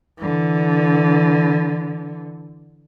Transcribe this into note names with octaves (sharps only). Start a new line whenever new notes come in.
D3 E3